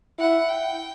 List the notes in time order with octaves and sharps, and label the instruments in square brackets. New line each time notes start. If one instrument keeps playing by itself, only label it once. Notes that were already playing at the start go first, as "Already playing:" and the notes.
[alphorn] E4 [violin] F#5
[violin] G5